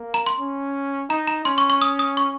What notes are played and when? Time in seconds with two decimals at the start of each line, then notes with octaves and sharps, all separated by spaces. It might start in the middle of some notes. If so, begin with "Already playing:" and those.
Already playing: A#3
0.14 A#5
0.27 C6
0.38 C#4
1.10 D#4 A#5
1.27 A#5
1.45 C#4 C6
1.58 C#6
1.70 C#6
1.81 D#6
1.99 D#6
2.17 C#6